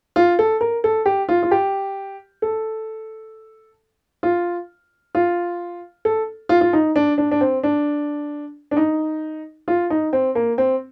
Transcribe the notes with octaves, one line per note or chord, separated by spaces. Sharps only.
F4
A4
A#4
A4
G4
F4
F4
G4
A4
F4
F4
A4
F4
F4
D#4
D4
D4
D4
C4
D4
D4
D#4
F4
D#4
C4
A#3
C4